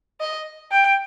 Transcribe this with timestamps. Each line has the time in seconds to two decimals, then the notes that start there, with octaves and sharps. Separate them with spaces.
0.20 D#5
0.71 G5